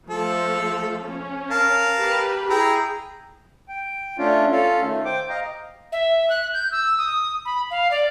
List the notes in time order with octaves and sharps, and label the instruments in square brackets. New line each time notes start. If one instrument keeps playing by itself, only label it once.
[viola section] F3 A3 [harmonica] A4
[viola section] C#4
[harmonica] A#4 F5 A5
[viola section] G4 B4
[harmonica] E4 G5 A#5 [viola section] G#4
[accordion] G5
A3 C#4 D4 F4
C#4 F4 A4 F5
D#3 A3
C5 G5 D6
D#5 F5 A#5
[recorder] E5
F#6
G6
E6
D#6
B5
F5
D5